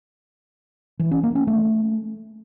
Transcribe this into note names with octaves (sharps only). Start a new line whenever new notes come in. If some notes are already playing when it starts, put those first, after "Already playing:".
E3
C#4
A#3
C#4
A3